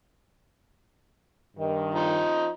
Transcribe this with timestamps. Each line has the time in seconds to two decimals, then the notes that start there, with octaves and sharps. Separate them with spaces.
1.57 G2 D#3
1.94 F3 D#4 D#5